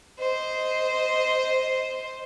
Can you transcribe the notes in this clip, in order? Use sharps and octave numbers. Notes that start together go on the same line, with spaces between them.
C5 D#5